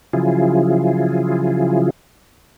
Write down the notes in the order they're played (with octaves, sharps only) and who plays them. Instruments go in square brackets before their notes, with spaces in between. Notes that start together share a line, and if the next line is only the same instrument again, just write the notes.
[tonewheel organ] C#3 F3 F#3 E4 F4 G#4